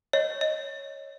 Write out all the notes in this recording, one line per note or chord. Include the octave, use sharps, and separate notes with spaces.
C#5 D#5
D#5